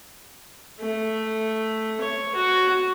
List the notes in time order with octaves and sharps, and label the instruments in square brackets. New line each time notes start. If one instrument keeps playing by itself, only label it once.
[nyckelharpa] A3
C#5
F#4